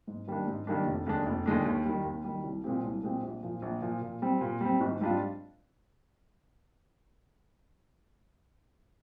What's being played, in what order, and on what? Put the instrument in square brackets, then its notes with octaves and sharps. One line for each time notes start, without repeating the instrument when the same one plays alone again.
[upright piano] G#2
D#3 G3 A#3 D4
G#2
D#3 G3 A#3 D4
F1
D#2 D3 G#3 D4
F1
D#2 D3 G#3 D4
D#2
D#3 G3
D#2
D#3 G3
C2
A#2 G#3 C4 G4
C2
A#2 G#3 C4 G4
A#1
A#2 F3
A#1
A#2 F3
A#2
G3 C4
A#2
G3 C4
G#1
G#2 G3 D4 F4